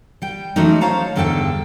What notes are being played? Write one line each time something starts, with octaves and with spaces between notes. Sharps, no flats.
G3 G5
E3 F#3 G#3 A3 C#4 D#4
C5 C#5 F5 A5 A#5
E2 G2 D3 A4 G5 A5